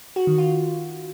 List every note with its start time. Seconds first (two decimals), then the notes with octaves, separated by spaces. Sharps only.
0.16 F#4
0.27 D#3
0.38 F4